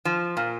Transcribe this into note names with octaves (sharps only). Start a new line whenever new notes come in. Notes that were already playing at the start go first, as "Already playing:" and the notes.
F3
A#2